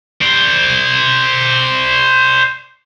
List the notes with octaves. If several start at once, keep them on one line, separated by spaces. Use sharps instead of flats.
C5 D5